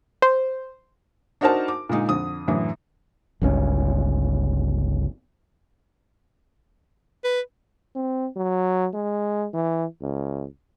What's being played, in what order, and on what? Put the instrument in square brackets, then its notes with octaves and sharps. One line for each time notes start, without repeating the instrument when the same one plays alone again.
[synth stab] C5
[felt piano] D4 D#4 F#4 A#4 C5 A5
D6
A#2 D3 G#3 D#4
F2 D3 D#6
F#2 A2 D3 E3
[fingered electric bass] G1 C#2 C#3 C#4
[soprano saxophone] B4
[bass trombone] C4
F#3
G#3
E3
C#2